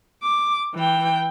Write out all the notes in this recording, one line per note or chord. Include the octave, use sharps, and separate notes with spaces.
D6
E3 G5